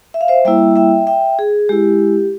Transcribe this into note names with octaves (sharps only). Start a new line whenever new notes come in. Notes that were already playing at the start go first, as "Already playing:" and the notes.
E5
F5
C5 E5
G3 A#3 E4 E5 G5
E5 G5
E5 G5
G#4
G#3 E4 G4